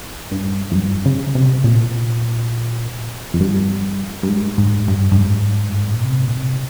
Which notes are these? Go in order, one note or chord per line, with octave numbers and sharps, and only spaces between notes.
G2
F2
G2
C#3
C3
A#2
F2
G2
G2
G#2
G#2
G2
G2
G#2
G2
G#2
A#2
C3
A#2
C3